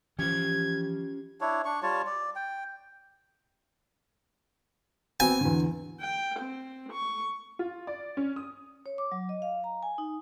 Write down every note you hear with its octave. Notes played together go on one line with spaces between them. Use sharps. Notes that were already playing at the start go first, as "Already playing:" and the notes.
E3 F3 C#4 F4 G4 C5 G#6
D4 E4 C#5
D4 C#6
G3 F4 C#5 A5
D5
G5
B3 C4 F#4 G#5
E2 D3
G5
C4
C#6
F4
D5
C#4
D#6
C#5
D6
F#3
D#5
F5
A#5
G#5
D#4